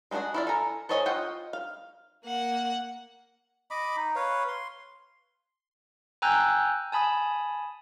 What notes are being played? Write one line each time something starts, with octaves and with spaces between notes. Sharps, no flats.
G#3 B3 D4 F#4 G#4
E4 F4 D5
A4 G#5 A#5
A4 C5 C#5 D#5 G#5
F4 D#5 F#5 G5
F5
A#3 F#5
D#5 B5 D6
D#4
B4 C#5 F5
C6
G5 G#5 A#5 E6 F#6 G6
G#5 A5 B5 D#6